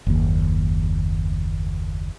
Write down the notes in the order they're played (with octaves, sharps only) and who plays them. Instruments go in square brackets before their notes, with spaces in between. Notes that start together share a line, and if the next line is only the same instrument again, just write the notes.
[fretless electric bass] F#1 D#2